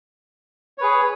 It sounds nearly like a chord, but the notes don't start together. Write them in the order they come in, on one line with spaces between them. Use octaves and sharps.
C#5 B4 G#4